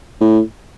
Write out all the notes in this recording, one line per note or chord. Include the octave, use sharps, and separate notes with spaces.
A2